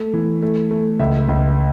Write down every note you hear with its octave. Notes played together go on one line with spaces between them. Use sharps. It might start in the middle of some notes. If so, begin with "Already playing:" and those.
Already playing: A3
E3
A3
A3
C#2 E5
C#2